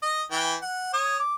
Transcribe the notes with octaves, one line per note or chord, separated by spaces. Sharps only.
D#5
E3 G5
F#5
C#5 D#6
D6